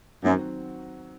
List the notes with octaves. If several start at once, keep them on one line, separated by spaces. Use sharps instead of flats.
F#2 D#3 F#3 C4 F#4